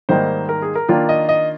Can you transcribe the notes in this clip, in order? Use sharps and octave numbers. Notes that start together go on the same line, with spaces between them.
G#2 D#3 G3 A#3 D#4 C5
A#4
G#4
A#4
D#3 A#3 D4 F4
D#5
D#5